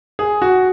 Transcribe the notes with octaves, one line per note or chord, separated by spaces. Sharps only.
G#4
F#4